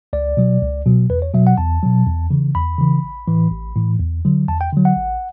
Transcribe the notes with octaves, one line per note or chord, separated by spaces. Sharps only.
C#2 D5
B2 F#3
C#2
B2 F#3
E2 B4
C#5
B2 F#3 E5
F#5
E2 A5
B2 F#3
E2
C#3 E3
E2 B5
C#3 E3
A1
A2 E3
A1
A2 E3
E2
D3 F#3
E2 A5
G5
D3 F#3
F#5
A1